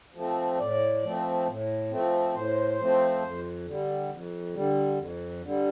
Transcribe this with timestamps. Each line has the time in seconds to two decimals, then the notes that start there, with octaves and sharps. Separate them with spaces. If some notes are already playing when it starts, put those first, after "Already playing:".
0.15 F3 A3 C4
0.59 A2 D5
1.03 F3 A3 C4
1.47 A2
1.91 F3 A3 C4
2.34 A2 C5
2.79 F3 A3 C4
3.22 F2
3.66 D3 G3
4.11 F2
4.55 D3 G3
4.98 F2
5.43 D3 G3